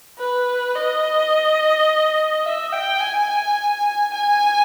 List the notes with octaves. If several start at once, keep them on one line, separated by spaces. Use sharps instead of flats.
B4
D#5
E5
G5
G#5
G#5